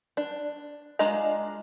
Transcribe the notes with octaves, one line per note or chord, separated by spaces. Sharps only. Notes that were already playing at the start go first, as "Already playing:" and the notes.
D4
G#3 D4 F4 D#5 A#5